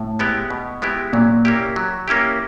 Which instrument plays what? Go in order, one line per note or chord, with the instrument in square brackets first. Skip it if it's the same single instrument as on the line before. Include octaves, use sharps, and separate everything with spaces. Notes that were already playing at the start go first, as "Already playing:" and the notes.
Already playing: [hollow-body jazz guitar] A2
[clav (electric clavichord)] G#3 B3 E4 G4
B2
G#3 B3 E4 G4
[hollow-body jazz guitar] A#2 [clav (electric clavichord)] F#3
[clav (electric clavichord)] A#3 C#4 E4 G4
F#3
A#3 C#4 E4 G4